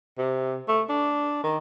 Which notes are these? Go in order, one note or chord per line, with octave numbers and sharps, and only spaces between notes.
C3
A3
D4
D#3